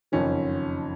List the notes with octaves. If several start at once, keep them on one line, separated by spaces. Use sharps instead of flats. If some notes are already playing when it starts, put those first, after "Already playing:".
F#1 F2 D#3 C#4